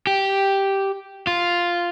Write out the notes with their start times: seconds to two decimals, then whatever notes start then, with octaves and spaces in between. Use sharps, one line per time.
0.07 G4
1.27 F4